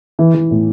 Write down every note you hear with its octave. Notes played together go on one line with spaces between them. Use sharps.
E3
E3
A2